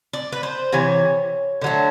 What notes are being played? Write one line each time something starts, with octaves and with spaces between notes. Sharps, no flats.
D5
B4
C5
C3 E3 C#5
D3 F#3 A3